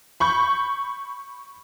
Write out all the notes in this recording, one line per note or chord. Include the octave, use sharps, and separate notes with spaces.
B5 C#6 G6